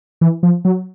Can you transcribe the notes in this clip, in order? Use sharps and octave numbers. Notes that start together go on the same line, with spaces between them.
E3
F3
F#3